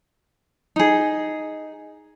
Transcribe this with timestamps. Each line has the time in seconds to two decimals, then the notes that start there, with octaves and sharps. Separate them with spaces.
0.76 D#4 G#4